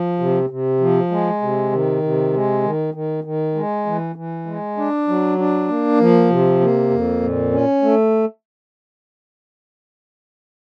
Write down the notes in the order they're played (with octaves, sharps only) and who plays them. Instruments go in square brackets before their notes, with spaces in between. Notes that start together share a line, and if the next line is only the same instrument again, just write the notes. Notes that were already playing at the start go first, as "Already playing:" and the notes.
Already playing: [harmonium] F3
C3
C3
F3
G#3
C3
D#3
C3
G#3
D#3
D#3
D#3
G#3
E3
E3
G#3
D4
F#3
D4
A#3
F3
C3
A#3
F2
A#2
C#4
A3